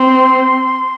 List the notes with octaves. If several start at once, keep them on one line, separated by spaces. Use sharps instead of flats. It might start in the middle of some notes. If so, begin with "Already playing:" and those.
Already playing: C4 C6